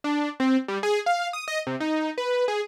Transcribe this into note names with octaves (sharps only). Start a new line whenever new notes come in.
D4
C4
G3
G#4
F5
D#6
D#5
C3
D#4
B4
G#4